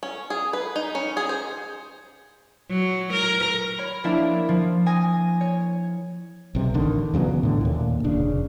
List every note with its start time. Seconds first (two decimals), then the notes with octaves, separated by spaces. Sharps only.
0.03 C#4
0.30 G#4
0.53 B4
0.76 D#4
0.95 C#4
1.17 G#4
1.29 C5
2.70 F#3
3.13 A#4
3.78 C#5 B5
4.04 F3 A#3 D4 E4 E5
4.49 F3
4.86 G#5 D#6 A#6
5.41 C#5
6.55 B1 C3
6.74 A1 D3 D#3
7.14 E2 C#3 F#3 B3
7.43 A2 D3
7.61 D#2 A#2
8.04 F1 C#3 D4